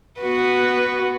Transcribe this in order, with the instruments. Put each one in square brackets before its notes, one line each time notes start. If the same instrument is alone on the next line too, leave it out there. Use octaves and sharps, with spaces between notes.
[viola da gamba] B3 F#4 B4